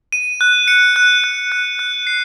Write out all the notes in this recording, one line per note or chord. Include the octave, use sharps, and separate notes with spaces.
D#7
F#6
C#7
F#6
F#6
F#6
F#6
C7